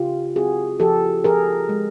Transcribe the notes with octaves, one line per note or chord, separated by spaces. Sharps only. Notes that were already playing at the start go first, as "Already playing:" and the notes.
Already playing: C#3 F4 G4
C4 F#4 G#4
F3 G4 A4
F3 G#4 A#4
G#3